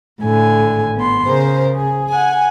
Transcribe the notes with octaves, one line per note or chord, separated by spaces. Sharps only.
A2 D3 G#5
G#1
B3 C6
C#3 G#4 A#4 C5
G#4
F#5 G#5